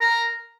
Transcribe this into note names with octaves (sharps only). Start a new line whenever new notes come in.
A#4